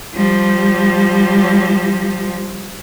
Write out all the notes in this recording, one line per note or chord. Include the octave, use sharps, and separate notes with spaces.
F3 G3